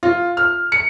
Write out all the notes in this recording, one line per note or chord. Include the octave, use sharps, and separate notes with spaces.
F4
F6
C#7